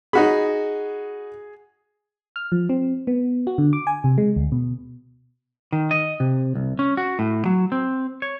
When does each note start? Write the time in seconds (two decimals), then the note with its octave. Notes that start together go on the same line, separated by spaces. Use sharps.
0.13 D#4 F#4 G#4 B5
2.36 F6
2.52 F3
2.69 C4
3.07 B3
3.47 F#4
3.58 D3
3.73 D6
3.87 G#5
4.04 C3
4.18 G#3
4.36 D2
4.52 B2
5.72 D#3
5.91 D#5
6.20 C3
6.55 C2
6.79 C#4
6.97 F#4
7.19 A2
7.45 F#3
7.72 C4
8.22 C#5